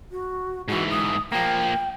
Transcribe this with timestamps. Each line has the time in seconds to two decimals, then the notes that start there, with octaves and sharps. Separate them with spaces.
0.12 F#4
0.68 G#2 E3 F#4
0.90 D#6
1.32 F3 A#3 G5